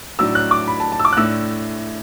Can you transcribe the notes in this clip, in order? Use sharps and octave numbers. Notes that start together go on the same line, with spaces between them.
A2 F#3 D4 E6
F#6
D6
B5
A5
A5
E6
D6
F#6
A2 A3 D4 E6